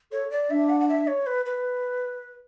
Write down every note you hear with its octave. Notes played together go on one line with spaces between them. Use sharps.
A4 C#5
D5
D4 E5
F#5
F#5
E5
C#5
B4
B4